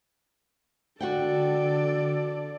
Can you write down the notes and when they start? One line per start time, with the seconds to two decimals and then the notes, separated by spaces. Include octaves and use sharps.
1.01 D3 F#4 A4 D5 F#5 G5